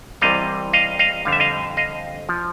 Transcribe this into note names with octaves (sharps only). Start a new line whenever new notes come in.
C2 C3 E3 G3 D#5 F5
D#5 F5
D#5 F5
F2 D3 G3 F5
E5
D#5 F5
D#5 F5
F3